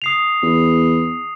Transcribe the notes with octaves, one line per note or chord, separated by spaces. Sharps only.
D#6 C7 F7
E2